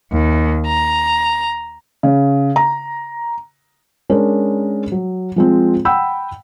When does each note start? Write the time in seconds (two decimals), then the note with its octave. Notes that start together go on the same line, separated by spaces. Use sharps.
0.12 D#2
0.66 A#5
2.03 C#3
2.56 A#5
4.10 G#3 C#4 D4 A#4
4.92 F#3
5.36 F3 G#3 C4
5.85 F#5 G5 B5 E6